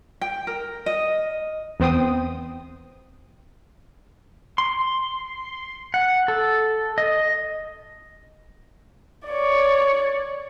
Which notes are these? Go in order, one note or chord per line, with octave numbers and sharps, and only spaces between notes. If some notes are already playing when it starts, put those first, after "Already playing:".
G5
A#4
D#5
E2 B3 C4 C5 G5 D#6
C6
F#5
A4
D#5
C#5 D5